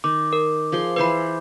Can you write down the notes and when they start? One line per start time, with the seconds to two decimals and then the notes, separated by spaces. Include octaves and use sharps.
0.04 D#3 D6
0.33 A#4
0.72 F3 G#4 C6
0.96 E3 B4 C5 B5 C6